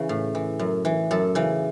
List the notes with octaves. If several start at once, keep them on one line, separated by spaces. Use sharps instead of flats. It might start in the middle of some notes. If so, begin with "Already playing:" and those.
Already playing: E2 C#3 E3
A2
E3
F#2
E3
F#2 A4
C#3 E3